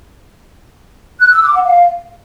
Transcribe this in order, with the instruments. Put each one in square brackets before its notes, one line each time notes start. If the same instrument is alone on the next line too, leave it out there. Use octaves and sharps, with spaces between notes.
[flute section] F#6
E6
D6
F#5
F5